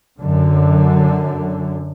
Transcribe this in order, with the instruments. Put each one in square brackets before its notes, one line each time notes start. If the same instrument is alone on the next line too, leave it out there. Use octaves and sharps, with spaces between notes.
[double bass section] F#2 D3